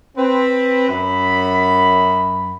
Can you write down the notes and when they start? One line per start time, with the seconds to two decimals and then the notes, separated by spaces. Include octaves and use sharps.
0.16 C4 B4
0.88 F#2 B5